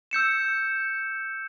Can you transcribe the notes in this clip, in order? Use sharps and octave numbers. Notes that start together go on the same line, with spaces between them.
E6 G6 C#7 E7